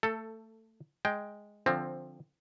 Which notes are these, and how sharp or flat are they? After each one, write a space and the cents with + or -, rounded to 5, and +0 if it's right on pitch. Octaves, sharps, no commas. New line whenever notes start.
A3 +20 A4 +10
G#3 +0 G5 +0
D3 +0 F3 +0 C4 +15